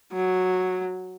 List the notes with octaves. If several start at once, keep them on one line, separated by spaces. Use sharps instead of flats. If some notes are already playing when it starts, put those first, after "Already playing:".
F#3